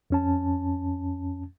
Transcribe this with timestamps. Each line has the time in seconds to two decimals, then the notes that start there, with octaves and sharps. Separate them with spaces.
0.10 F2 C#4 A5